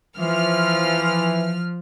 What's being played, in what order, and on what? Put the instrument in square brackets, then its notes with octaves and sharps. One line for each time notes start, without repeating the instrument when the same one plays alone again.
[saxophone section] E3 [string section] F3 F6